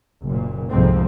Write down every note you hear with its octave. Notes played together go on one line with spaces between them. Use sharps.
F#1 A#2
C2 F2 G#2 C4